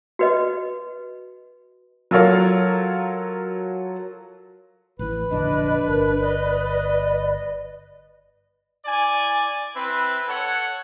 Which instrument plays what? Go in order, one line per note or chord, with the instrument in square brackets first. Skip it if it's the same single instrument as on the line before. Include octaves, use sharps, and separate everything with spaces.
[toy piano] F#4 B4 D#5
[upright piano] F#3 F4 A4 A#4 C#5 F5
[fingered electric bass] A1 E3 [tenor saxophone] B4
[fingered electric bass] F1 A#1 D3 [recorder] D4 [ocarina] D#5
[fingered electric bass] G1 [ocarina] A#4
[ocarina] D5 [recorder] D#5
[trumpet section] E4 D5 G#5
C4 E4 B4
A4 C#5 F#5